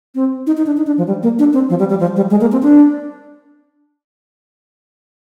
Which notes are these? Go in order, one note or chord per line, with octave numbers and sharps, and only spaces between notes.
C4
D#4
D#4
D4
D#4
D4
F3
G3
A#3
D4
C4
F3
G3
G3
F3
G3
G#3
A#3
C4
D4